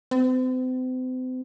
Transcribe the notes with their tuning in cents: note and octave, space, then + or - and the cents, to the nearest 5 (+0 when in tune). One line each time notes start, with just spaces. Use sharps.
C4 -40